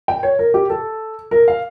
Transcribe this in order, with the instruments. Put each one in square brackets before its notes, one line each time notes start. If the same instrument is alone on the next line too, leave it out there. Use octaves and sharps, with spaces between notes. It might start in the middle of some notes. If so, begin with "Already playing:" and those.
[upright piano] G5
C#5
A#4
G4
A4
A#4
F5